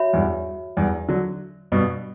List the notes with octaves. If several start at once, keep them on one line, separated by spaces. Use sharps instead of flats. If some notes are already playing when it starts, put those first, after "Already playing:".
Already playing: F#4 C#5 E5 B5
E2 G2
E2 G2
D3 F#3
G2 B2